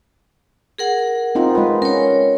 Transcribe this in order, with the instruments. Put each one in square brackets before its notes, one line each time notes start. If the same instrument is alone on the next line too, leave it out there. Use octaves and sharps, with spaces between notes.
[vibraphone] G#4 A#4 F#5
[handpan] C4 D#4 F4
G#3 B4
[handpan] C#4 [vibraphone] A#4 C#5